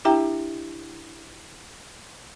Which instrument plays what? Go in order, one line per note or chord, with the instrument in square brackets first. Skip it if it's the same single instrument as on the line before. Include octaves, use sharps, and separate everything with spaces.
[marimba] D4 E4 G4 E5 G5 A#5